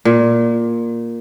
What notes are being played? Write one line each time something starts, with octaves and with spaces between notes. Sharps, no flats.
A#2